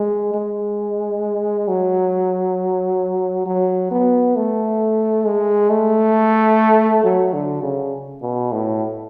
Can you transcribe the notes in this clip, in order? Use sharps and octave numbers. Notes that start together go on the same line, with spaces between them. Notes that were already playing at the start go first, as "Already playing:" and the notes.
Already playing: G#3
G#3
F#3
F#3
B3
A3
G#3
A3
F#3
D3
C#3
B2
A2